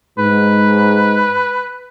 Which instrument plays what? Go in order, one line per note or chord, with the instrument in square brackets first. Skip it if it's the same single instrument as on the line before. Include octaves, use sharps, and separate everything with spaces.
[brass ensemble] G#2 [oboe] B4